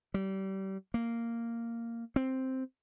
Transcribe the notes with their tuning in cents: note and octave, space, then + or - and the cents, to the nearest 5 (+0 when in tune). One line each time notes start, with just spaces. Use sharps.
G3 -30
A#3 -10
C4 +0